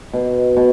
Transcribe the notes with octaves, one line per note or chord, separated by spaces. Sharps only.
B2
B2